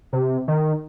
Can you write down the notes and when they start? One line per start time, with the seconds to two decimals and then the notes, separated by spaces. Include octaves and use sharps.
0.13 C3
0.48 D#3